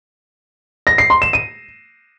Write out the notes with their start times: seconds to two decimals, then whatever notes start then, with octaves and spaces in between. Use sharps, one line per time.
0.87 A#6
0.98 C7
1.10 C6
1.22 E7
1.33 D#7